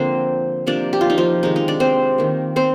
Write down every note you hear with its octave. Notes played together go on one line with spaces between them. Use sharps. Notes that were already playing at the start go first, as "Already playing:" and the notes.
Already playing: D3 F3 A#3 C4 C5
C3 F3 A#3 D4 D5
G4
F4
D#4
F3 F4
C3 D#3 G#3 D#4
D#4
D4 D5
C4 C5
D#3 A#3
C4 C5